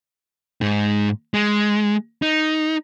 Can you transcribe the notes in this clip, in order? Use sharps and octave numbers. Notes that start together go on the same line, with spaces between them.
G#2 D#4
G#3
D#4